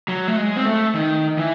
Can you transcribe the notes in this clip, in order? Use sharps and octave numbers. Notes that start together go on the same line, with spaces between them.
F#3
A3
G#3
C4
A3
D#3
E3